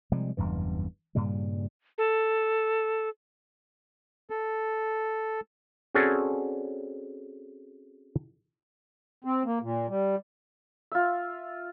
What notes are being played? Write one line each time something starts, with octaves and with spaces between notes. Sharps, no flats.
C3 F3 G3 G#3
F#1 E2 G2 E3
G2 A#2 C#3 G3
A4
A4
C4 C#4 F#4 G#4 A4 D5
C4
A#3
A#2
G3
F4 E5